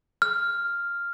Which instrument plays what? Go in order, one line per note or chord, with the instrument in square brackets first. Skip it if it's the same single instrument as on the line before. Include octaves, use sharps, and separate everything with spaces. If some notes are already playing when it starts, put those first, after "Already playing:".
[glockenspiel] F6